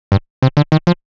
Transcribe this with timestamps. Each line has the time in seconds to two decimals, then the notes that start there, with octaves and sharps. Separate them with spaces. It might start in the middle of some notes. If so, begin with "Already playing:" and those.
0.12 G2
0.42 C3
0.57 D3
0.72 D#3
0.87 F3